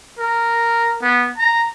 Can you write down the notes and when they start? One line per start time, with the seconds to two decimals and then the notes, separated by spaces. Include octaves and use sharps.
0.19 A#4
1.02 B3
1.38 A#5